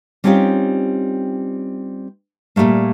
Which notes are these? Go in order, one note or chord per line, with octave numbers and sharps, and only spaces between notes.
G3 C4 C#4 D#4 F4 G4
A#2 E3 G3 A3 A#3